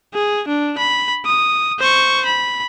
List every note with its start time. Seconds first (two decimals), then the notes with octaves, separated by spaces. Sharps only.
0.14 G#4
0.48 D4
0.78 B5
1.26 D#6
1.79 C5 C#6
2.26 B5